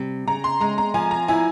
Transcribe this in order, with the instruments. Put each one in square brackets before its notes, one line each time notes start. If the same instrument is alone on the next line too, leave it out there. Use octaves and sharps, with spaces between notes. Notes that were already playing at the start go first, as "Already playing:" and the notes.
Already playing: [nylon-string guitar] C3 G3
[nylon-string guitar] C#3 [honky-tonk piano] A#5
[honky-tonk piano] C6
[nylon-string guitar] G#3 [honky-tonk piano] A#5
[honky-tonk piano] A#5
[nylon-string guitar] F3 [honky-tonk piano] G#5
[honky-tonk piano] A#5
[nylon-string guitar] E4 [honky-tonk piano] G#5